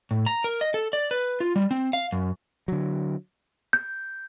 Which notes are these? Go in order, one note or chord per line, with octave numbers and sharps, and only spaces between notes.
A2
A#5
A#4
D#5
A4
D5
B4
F4
G3
C4
F5
F#2
D3 F#3
G6